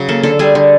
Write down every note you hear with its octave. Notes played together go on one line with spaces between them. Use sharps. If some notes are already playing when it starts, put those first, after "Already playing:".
Already playing: C#3 F#3
A#3 A4
D3 A4
G3 G#4
D3